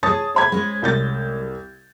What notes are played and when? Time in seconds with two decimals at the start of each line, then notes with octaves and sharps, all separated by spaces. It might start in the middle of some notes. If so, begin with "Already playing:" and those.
0.03 G#4 C#5 A5 D#6 A6
0.35 C5 B5 G#6
0.52 G#3 C#4
0.82 C2 G6 A6